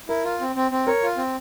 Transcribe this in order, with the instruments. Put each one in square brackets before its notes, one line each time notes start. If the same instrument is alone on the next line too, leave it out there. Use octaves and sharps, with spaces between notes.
[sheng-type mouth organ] E4 [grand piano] A#4
[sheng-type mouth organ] F4
C4
C4
C4
[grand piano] A#4 [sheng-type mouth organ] C#5
[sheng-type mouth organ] F4
C4